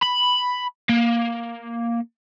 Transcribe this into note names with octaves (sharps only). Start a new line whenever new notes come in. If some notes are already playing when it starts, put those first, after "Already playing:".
B5
A#3